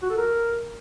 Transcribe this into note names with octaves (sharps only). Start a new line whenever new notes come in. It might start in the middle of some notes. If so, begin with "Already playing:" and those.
F#4
A4
A#4